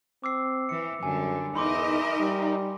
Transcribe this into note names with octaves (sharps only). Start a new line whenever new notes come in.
C4 D6 E6 C7
E3 C#7
F#2 D3 G3 G#5
E2 D#4 A#4 D#5 E5 B5 C6 D6
G3